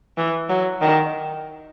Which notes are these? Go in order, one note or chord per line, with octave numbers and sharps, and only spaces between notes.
E3
F#3
D#3